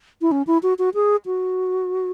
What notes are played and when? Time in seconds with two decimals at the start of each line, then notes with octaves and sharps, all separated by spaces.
0.21 E4
0.32 C#4
0.47 E4
0.63 F#4
0.79 F#4
0.95 G#4
1.26 F#4